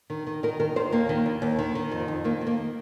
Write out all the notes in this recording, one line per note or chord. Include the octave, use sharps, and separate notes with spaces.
D#3
D#3
D#3 A#4
D#3 A#4
D#3 C5
D#2 A#3
D#3
D#2
D#2
D#3
D#3
F2
F2
D#3 A#3
D#3
A#3